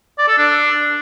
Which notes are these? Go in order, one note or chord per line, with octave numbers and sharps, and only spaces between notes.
D5
A4
D4